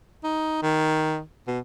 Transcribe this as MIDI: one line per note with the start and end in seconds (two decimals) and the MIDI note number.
0.24 0.60 63
0.63 1.21 51
1.47 1.59 47